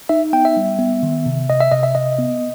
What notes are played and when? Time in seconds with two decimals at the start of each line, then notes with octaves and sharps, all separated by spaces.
0.09 D#4 E5
0.33 B3 G5
0.45 E5
0.57 G3
0.79 B3
1.03 D#3
1.26 C3
1.49 C3 D#5
1.61 E5
1.72 C3 D#5
1.83 E5
1.95 C3 D#5
2.18 B3